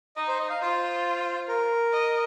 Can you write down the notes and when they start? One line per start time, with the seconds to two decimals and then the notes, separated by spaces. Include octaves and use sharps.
0.17 D#4 D#5
0.28 C5
0.39 D#5
0.50 F5
0.61 F4 C5
1.48 A#4
1.92 D#5